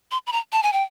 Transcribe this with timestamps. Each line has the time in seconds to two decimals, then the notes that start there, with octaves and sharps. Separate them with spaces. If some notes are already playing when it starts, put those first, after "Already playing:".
0.11 C6
0.27 B5
0.33 A#5
0.53 A5
0.63 G#5
0.73 G5